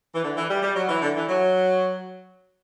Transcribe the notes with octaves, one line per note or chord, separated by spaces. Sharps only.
E3
D3
E3
G3
G3
F#3
E3
D3
E3
F#3